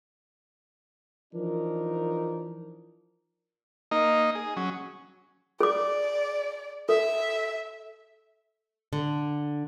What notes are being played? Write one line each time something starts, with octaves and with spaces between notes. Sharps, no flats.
E3 F3 D4 D#4 A#4
A#3 D#4 D#5
G#4
F#3 C#4
G#4 D5 D6
A4 E5
D3